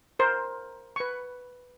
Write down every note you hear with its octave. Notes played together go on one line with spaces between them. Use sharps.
A#4 C5
B4 C#6